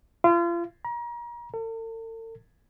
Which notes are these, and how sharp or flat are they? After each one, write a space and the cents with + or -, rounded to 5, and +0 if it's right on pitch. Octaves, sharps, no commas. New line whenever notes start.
F4 -35
A#5 +35
A4 +45